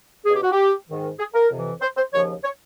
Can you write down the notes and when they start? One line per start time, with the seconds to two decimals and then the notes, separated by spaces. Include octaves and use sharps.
0.26 C#2 B2 G#4
0.35 G4
0.43 F#4
0.52 G4
0.88 G#2 D#3
1.19 G#4
1.34 A#4
1.50 F2 C3 E3
1.81 C5
1.97 C5
2.12 D#2 C#3 F3 C#5
2.43 C#5